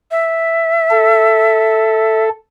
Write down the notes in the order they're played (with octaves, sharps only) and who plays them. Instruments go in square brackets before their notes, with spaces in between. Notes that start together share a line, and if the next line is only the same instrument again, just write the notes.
[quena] E5
[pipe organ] A4